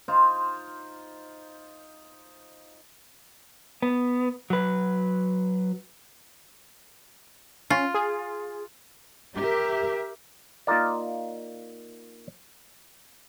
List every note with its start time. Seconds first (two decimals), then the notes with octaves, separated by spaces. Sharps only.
0.08 D#4 F4 C5
3.82 B3
4.50 F#3 B4
7.70 C#4 F4
7.94 G#4
9.36 G4 A#4 E5
10.67 A#3 D#4 F4 A#4 D5